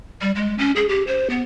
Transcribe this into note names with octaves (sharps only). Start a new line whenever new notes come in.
G3
G#3
C#4
G#4
G4
C5
B3